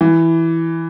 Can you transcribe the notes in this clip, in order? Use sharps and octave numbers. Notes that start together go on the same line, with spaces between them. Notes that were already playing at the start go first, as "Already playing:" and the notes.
E3